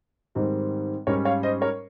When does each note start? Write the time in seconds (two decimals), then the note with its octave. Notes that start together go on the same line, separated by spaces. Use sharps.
0.35 G#2 D#3 G3 C4
1.07 G#2 G3 C#4 A#4 C#5
1.25 C#5 F5
1.43 C5 D#5
1.61 A#4 C#5